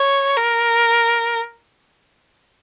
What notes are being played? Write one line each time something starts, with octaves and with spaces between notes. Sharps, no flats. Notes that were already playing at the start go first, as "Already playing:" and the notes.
Already playing: C#5
A#4